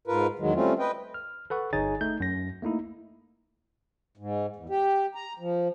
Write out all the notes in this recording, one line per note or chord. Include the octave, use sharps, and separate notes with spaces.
G#2 F4 A#4 B4
E2 D#3 F#3 G#3
G3 A3 C4 C#4 F4
B4 D#5 G5
F6
A4 B4 F#5 C#6
G1 D#4 G#4 C#5 G#5 A6
A3 D#4 G6
F#2 A#6
A3 A#3 D#4 E4
G#2
E2
G4
A#5
F3